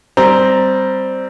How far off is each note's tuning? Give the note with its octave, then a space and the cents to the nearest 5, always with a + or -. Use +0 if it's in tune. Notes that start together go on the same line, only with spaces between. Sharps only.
G3 +0 C4 +0 A#5 +0